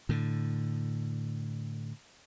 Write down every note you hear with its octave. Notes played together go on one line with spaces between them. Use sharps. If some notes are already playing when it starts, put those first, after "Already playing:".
A2 D3